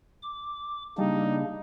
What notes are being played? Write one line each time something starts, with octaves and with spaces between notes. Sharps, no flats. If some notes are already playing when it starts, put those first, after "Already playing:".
D6
C#3 G3 A#3 D4 D#4